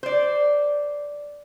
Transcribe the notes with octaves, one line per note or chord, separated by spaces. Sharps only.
C5 D5